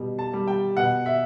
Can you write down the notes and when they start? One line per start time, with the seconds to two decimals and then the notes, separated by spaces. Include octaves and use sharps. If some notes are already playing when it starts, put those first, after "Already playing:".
Already playing: B2 G3
0.19 A5
0.33 G3
0.47 G5
0.77 B2 F#5
1.06 E5